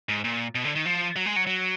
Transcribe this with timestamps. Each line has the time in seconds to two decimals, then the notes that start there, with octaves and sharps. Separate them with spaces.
0.09 G#2
0.24 A#2
0.55 B2
0.65 D3
0.76 D#3
0.86 F3
1.16 F#3
1.26 G#3
1.36 F#3
1.47 F#3